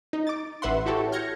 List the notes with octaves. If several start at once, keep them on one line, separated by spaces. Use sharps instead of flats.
D#4
D6 A6
A1 B4 E5 F#5 C6
E4 F#4 G4 A4 C#5
F6 G6 G#6 A#6 C#7